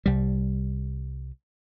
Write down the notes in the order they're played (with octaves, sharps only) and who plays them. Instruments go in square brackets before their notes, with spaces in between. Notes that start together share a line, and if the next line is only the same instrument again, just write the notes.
[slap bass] C2 G3